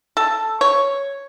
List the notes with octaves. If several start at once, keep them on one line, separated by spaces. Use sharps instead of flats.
A4
C#5